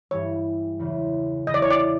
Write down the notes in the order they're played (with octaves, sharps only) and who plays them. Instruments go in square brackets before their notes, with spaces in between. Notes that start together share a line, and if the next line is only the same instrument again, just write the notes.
[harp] G2 E3 G3 [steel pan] C#5
[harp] E2 C#3 E3 G#3
[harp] E2 C#3 E3 G#3 [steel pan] D#5
[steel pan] D5
C#5
D5